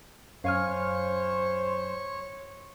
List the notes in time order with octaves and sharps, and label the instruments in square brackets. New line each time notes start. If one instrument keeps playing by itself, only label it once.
[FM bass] F#2 [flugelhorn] C5 [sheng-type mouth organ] C#5 [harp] F5 G#5 F6